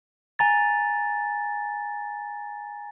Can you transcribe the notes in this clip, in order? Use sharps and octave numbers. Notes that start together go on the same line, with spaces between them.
G#5 A#5 A6